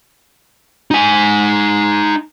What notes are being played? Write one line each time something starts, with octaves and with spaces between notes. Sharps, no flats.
D#4 G#5